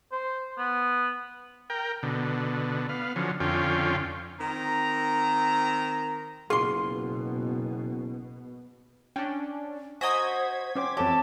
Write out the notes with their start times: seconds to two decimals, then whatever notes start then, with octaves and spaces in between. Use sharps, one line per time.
0.12 C5
0.58 B3
1.70 A#4 G5
2.03 B2 D3
2.89 B3 F5
3.16 D3 F3 F#3 C#4
3.40 F2 D3 C#4 F4 G5
4.40 D#3 C4 A#5
6.50 F#1 B2 F4 G#4 C6
9.16 C#4 D4 G5
10.01 F#4 C5 D#5 G#5 A#5 G#6 B6
10.76 C#4 C5 G5 D6
10.97 F2 E3 C4 G4 A4 C#5 A5